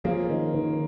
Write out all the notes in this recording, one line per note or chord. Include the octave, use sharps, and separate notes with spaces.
F3 A#3 C#4 G#4 C5
D#3
D#3